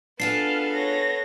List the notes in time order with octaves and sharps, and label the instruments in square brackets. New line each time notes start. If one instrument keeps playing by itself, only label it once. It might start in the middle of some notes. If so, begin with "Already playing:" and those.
[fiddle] B3 A4 [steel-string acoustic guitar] D4 F4 G#4 [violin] F5 A5 [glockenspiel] C7
[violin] C#5 A#6